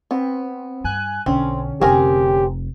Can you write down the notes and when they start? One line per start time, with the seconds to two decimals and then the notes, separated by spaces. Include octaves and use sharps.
0.11 B3 C4
0.84 G2 G#5 F#6
1.26 B1 D3 C4 C#4
1.81 F1 C4 G4 G#4 A#4